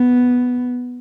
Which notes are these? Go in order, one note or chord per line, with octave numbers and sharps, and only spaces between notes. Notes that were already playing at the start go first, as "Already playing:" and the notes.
Already playing: B3